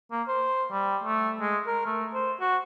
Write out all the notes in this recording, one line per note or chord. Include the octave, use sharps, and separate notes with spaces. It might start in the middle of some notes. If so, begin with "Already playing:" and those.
A#3
C5
G3
A3
G#3
A#4
A3
C5
F#4